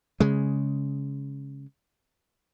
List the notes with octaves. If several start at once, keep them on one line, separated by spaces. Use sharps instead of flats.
C#3 G#3